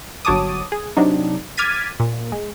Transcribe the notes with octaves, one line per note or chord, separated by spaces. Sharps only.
G1 F#3 C#5 A5 D6 D#6
G#4
C3 F#3 D4 D#4
D6 F6 G#6 A6 B6 D#7
A#2
G#3